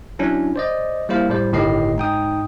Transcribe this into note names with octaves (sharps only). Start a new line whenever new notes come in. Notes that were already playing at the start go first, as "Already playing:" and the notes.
F#3 C#4 D4 E4
C5 D5 D#5
G3 A#3 E4 C5 F5
A2 G3 C5
G1 A2 D#3 G4 D#5 C7
G#2 D#4 G5 D#6